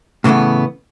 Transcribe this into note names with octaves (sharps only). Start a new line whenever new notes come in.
A2 C#3 E3 A3 B3